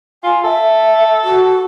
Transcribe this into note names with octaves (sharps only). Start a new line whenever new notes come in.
F4 G#5
A4 E5
F#4